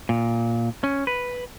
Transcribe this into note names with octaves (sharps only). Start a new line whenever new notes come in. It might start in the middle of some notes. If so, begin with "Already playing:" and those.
A#2
C#4
B4